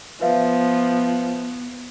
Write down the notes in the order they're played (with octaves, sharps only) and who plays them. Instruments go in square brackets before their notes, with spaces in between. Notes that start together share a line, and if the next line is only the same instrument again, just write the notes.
[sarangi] F3 [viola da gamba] B3 [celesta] B4 E5 F5